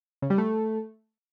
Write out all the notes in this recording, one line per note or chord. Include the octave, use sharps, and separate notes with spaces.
C#3
G3
A3